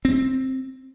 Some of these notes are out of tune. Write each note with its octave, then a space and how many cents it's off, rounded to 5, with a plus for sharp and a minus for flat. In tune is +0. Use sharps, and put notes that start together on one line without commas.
C4 +5